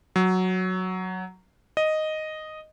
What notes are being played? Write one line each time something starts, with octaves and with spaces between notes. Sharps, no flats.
F#3
D#5